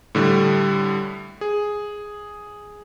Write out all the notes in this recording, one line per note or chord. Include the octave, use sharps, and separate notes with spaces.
A2 D3 G3 D4
G#4